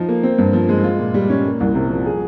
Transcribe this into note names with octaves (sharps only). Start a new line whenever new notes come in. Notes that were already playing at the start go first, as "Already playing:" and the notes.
Already playing: F3 D#4
A#3
C4
G2
F3
G#3
F4
A#2
G3
C#4
A#3
C2
C3
F3
G#4